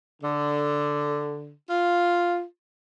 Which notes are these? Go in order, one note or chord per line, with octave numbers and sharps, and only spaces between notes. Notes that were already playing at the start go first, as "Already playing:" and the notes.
D3
F4